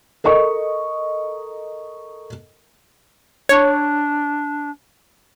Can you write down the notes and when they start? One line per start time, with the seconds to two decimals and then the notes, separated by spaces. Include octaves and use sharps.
0.24 A4 A#4 D#5 C#6
3.49 D4 C#5